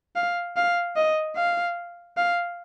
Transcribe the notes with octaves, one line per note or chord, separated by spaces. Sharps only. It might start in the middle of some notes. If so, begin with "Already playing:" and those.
F5
F5
D#5
F5
F5